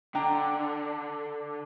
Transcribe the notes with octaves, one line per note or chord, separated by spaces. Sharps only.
D3 D4 G5 A#5